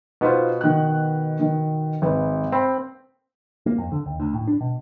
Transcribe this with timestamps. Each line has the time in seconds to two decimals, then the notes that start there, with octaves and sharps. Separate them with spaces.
0.21 B2 B3 D#4 F4 C5
0.61 D#3 F#6
1.40 D#3
2.02 G#1 B4
2.52 C4 B5
3.66 A#3
3.78 F2
3.92 D3
4.06 D#2
4.20 D2
4.33 A2
4.47 D4
4.60 B2